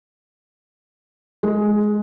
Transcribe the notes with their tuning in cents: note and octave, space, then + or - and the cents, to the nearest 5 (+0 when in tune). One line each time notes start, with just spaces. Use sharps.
G#3 +10